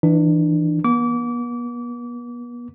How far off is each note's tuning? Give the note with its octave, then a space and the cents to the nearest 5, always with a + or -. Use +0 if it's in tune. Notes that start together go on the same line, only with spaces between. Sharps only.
E3 +0 D4 +30
B3 -40 D6 -30